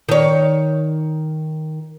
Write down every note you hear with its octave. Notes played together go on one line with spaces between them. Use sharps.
D#3 C#5